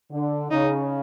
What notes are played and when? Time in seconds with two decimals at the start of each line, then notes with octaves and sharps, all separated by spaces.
0.12 D3
0.51 C#3 D#4